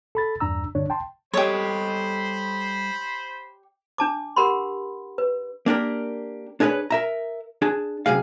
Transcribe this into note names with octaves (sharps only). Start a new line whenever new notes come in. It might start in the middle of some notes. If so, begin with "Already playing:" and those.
A4 B5 A6
E2 G2 D4 A#5 E6
G2 D3 D4 C#5
G5 A5 C6
G3 G4 A4 C5 C#5 D#5 B5
D4 A5 D6
G4 A#4 F#5 B5 C6
B4
A#3 D4 G4 A#4
D4 G#4 A#4 B4 C#5
A#4 E5 A#5
D4 G#4 A5
F#2 C3 G#4 F5